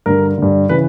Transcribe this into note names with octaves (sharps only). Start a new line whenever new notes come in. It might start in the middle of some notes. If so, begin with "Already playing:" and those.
G2 D3 A#4
G2 D3
C#3 E3 B4